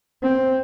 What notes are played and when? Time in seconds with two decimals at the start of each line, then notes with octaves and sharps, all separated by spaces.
0.23 C4